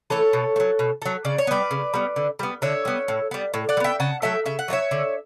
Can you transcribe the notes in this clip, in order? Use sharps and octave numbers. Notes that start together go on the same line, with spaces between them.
E3 A3 A4 C#5
B2
A3
F#3
B2
F#3 A3
C#3 D5
C#5
G3 B3 B4 D5
C#3
G3 B3
D3
G3 B3
D3 C#5 E5
G3 B3
A2
G3 B3
A2
D5 F#5
G3
B3 E5 G5
C#3 F#5 A5
F#3 A3 E5 G5
C#3 E5
F#5
F#3 A3 C#5 E5
D3